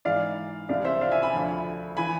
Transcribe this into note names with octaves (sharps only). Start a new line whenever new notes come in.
G#2 E3 D5 F5
C2 C3 E3 D5 F5
C5 E5
D5 F5
E5 G#5
G#5 B5
D2 D3 F3
E3 G#5 B5